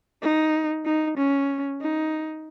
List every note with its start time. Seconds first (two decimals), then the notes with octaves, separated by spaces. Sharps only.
0.22 D#4
0.86 D#4
1.17 C#4
1.81 D#4